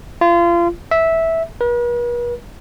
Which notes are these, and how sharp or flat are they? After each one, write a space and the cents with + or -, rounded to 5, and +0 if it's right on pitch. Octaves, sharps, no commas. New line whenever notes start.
F4 -30
E5 -10
B4 -45